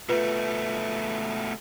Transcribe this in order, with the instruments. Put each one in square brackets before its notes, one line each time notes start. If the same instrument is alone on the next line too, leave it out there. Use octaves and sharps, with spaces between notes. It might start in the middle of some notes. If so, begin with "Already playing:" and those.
[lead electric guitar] B2 A3 [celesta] F4 B4